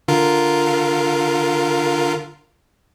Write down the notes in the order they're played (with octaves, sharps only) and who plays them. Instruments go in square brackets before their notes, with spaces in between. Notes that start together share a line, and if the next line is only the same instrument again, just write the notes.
[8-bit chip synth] D3 F4 A#4